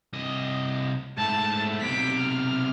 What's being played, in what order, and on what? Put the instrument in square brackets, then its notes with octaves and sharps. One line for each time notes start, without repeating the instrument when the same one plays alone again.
[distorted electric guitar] C2 D#5
[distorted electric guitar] G#2 A3 [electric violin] A5
[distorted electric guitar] B1 C3 [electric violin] B6 D7
[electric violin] F6